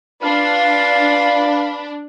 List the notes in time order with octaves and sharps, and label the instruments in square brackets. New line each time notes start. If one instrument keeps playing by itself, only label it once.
[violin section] D4 [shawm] F4 [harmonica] B4 B5 [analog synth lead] F5